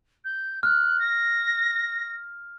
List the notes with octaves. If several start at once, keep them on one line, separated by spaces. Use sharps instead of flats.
G6
F6 F#6
A#6